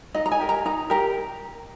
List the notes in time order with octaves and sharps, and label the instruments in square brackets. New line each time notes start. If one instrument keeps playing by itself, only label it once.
[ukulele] D#4 D#5
A#5
G#5
G4 A#4
A#5
D#4 A#5
G4 A#4 A#5